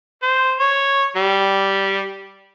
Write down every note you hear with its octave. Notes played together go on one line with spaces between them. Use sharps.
C5
C#5
G3